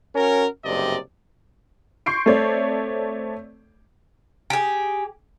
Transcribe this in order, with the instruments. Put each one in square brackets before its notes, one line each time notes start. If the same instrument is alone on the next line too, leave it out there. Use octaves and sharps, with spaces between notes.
[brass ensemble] C#4 F#4 A#4
F#1 G2 C3 D5 D#5
[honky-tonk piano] C6 C#6 G6 C7 D7
A3 C4 A4 C#5 D5
[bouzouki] G4 G#4